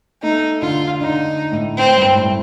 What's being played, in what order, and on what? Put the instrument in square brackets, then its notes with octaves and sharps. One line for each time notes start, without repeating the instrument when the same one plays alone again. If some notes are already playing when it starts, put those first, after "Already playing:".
[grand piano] A3 [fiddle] D#4
[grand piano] D3 [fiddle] F4
[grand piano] D3 [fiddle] D#4
[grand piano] A2
[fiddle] C4
[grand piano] G2
A2